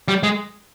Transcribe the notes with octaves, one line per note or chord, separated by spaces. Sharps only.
G3
G#3